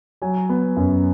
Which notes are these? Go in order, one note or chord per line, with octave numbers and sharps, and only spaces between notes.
F#3 G#5
B3
F#2